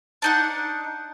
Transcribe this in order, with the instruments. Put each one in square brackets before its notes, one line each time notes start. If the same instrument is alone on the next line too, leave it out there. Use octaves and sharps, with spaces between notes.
[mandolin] D4 D#4 F#5